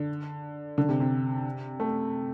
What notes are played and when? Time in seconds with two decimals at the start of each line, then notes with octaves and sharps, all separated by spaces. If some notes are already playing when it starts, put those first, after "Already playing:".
Already playing: D3
0.78 D3
0.89 C3
1.00 C3
1.80 A3